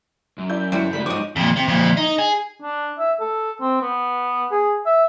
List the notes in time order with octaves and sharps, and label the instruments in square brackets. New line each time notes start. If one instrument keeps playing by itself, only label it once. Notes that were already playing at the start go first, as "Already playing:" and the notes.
[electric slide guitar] F#2
[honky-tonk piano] E4 D5 [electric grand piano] G6
[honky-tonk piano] G1 [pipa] G3 E4 F#4 [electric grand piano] D4 C#5
[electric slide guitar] C#3 F#4 A4 [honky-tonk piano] G3 A3 B3 [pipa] B5
[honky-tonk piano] G#2 F3 [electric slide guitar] F#3 D#4 C#5 [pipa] D#5 C#6 [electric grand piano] D6
[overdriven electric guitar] F2 A#2
C3
F2 A#2
D#4
G#4
[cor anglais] D4
E5
A4
C4
B3
G#4
E5